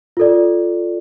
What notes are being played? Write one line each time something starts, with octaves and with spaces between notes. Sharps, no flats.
F4 A4 D5